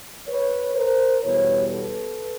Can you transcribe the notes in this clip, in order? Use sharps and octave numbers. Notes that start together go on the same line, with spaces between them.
B4 C#5
A#4 C5
E2 B2 G3 B4 C#5
A4 B4